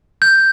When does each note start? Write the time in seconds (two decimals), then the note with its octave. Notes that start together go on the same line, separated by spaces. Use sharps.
0.22 G6